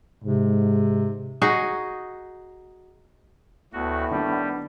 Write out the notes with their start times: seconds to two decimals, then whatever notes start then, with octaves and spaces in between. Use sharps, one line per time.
0.24 G#2 C3
1.42 D#4 F#4 G#4
3.73 D2 A2 B3 F#4
4.11 D#3 G3 D4